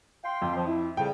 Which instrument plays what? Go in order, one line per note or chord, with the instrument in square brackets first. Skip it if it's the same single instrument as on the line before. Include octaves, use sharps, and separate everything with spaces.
[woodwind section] F5 G5 C6
[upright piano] F2
[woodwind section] F3
E4
[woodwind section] F2 C#3 G3 [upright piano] G5